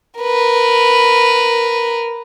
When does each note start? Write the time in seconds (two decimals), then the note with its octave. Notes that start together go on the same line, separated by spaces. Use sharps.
0.20 A#4 B4